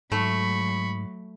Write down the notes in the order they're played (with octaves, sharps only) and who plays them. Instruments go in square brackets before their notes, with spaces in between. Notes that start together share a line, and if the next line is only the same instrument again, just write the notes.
[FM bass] G#2 [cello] F#3 [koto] A3 [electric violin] B5 C#6